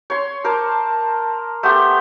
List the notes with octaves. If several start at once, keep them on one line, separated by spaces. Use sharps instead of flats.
C#5 C6
A#4 C5 A5 D6
A3 B3 G4 C6